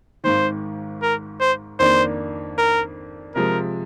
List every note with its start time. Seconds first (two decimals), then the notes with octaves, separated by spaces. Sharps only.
0.24 G#1 G#2 D#3 C5
1.02 A#4
1.40 C5
1.79 F2 D#3 A#3 D4 C5
2.58 A#4
3.35 C3 F3 G#3 A#4